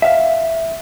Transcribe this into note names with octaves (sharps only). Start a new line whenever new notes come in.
E5 F5